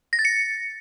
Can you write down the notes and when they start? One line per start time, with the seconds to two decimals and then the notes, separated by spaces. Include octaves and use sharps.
0.13 A#6
0.19 A6
0.25 C#7